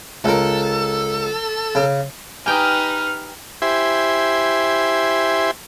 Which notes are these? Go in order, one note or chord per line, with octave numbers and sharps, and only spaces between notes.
C#2 A4 A#4
C#3
D#4 G4 B4 G5 G#5 A#5 D#6 F6
E4 G4 C5 E5 G#5 C6